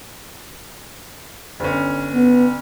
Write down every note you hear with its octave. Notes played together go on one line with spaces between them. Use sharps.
G1 C#4
B3